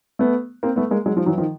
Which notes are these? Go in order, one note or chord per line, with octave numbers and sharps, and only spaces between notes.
A3 B3
A#3 C4
A3 B3
G#3 A#3
F#3 G#3
F3 G3
E3 F#3
D#3 F3